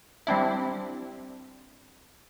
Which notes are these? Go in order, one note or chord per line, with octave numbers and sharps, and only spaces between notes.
G3 C4 D4 E4